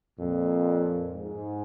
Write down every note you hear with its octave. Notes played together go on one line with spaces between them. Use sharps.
F2 A#2
G#2